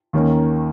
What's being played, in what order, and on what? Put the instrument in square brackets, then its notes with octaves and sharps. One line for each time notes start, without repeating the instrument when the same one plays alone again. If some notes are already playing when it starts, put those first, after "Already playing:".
[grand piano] D#2 D#3 A#3 C#4